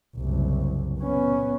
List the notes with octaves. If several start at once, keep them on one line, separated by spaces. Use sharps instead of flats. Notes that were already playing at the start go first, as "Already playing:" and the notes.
F#1 C2
B3 C#4